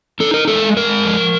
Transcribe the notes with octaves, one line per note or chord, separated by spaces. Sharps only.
D#4 A4
A#4
G#3 A4
G#3 A#4
F3